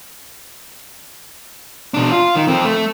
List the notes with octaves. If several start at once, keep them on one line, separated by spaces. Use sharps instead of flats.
B2 D4
F4
D#3
F2 C4
A3